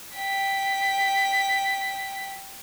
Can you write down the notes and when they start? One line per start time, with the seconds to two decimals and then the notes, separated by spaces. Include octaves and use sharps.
0.16 G5 B6